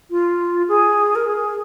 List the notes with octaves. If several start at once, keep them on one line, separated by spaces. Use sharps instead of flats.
F4
G#4
A#4
G#4